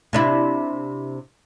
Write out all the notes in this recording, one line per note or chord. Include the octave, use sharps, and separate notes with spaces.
C3 D4 E4